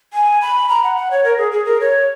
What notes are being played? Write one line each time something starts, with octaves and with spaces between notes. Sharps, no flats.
G#5
B5
A#5
F#5
F#5
C#5
A#4
G#4
G#4
A#4
C#5